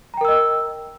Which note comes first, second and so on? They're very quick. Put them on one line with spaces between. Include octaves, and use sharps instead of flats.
A#5 G5 A#4 E6 D#5